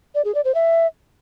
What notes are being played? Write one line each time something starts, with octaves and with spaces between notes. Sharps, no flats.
D5
G#4
D5
C5
E5